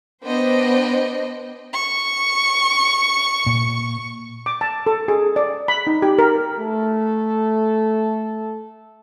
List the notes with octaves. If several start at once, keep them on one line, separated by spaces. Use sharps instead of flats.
B3 D4 C5 D#5 G5
C#6
A#2
D6
A5
A4
G#4
D5
B5
D#4
G4
A#4
A3 A4